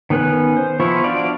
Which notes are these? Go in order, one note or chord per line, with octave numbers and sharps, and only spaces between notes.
D#3 B3 C#4 B4 F#6
C5
F3 B3 E4 F4 C#6
D4 F#4 D5 F5